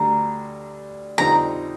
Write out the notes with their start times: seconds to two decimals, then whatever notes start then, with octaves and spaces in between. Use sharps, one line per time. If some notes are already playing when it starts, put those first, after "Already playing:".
Already playing: D2 D3 G3 D4 A#5
1.18 F2 D3 G3 C4 D#4 A#5